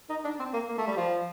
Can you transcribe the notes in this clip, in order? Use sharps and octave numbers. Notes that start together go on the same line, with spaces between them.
D#4
D4
C4
A#3
A#3
A3
G3
F3